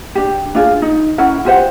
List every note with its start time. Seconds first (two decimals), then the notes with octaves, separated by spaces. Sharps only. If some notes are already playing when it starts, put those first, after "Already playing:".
0.15 D4 G4
0.55 D4 F4 G#4
0.82 D#4
1.18 C#4 E4 A#4 F#5
1.45 F4 G4 C5 F#5